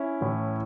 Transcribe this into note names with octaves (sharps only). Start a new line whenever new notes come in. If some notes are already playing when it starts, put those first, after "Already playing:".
Already playing: C#4 E4
A2 E3